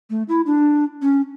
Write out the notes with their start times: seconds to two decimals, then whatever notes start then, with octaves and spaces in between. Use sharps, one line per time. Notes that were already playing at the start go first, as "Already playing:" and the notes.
0.10 A3
0.29 E4
0.46 D4
1.02 C#4